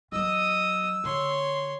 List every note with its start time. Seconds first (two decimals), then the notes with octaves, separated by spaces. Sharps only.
0.12 E3 F#3 D#5 D#6 E6
1.04 D3 C#5 C6